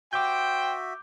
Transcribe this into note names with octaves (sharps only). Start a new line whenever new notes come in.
F#4 C5 E5 G5 D6 G6